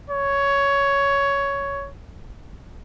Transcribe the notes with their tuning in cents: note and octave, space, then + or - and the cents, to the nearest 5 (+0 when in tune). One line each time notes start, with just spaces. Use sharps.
C#5 +10